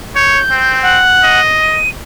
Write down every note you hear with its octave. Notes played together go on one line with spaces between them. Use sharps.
C#5 G6
C4
F#5
D#5
D#7